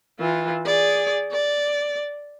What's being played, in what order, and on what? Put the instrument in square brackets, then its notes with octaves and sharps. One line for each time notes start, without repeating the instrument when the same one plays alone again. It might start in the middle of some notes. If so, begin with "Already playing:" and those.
[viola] E3 F4
G#4 D5
D5